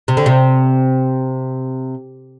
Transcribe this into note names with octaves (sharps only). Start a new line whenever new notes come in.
C3
D3
C3